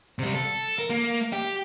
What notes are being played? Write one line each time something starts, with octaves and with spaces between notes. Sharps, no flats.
C3 G3
A4
A#4
A#3
G4